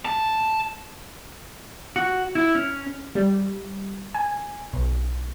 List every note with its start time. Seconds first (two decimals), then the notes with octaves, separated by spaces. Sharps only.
0.05 A5
1.96 F#4
2.35 E4
2.55 C#4
3.15 G3
4.14 G#5
4.73 B1